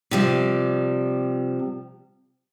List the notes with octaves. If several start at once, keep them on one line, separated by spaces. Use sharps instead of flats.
C3 F3 G3